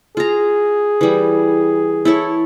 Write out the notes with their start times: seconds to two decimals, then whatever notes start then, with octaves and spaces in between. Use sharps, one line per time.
0.17 F4 G#4 A#5
1.01 E3 G3
2.05 E4 A4 C#5